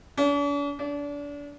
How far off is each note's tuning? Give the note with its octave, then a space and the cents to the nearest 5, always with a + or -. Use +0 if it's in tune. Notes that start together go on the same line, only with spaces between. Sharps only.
D4 -45
D4 -30